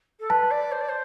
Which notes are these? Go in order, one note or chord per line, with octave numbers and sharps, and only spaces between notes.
A4
B4 A5
D5
C5
D5
C5